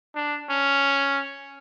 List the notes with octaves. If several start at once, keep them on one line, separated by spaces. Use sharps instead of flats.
D4
C#4